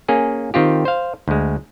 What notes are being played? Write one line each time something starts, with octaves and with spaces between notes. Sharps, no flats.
A#3 C#4 G#4
D#3 C4 F4 G4
C5 F5
D2 G#3